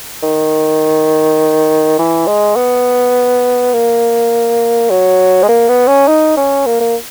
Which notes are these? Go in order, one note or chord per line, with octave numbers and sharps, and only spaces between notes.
D#3
E3
G#3
B3
A#3
F#3
G#3
A#3
B3
C#4
D#4
C#4
A#3
A#3